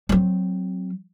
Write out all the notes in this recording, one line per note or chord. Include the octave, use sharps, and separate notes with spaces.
F#3 C4